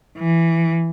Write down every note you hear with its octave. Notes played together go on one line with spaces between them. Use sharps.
E3